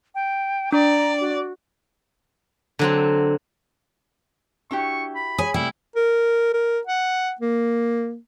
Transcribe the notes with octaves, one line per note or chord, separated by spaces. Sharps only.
G5
D4 D5 A#5
F#4
D3 F#3 C4
D4 E4 F#4 G4 C#6
B5
G#4 C#5 G#5 D#6
C3 G3 A3 E4 G5
A#4
A#4
F#5
A#3